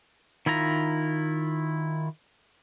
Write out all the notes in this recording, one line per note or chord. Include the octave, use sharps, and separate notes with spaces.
D#3 E4 F4 A#5